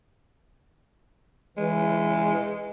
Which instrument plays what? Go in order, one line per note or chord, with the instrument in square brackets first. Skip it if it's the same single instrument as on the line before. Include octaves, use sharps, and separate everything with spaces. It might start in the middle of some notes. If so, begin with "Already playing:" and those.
[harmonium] E3 [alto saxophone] G#3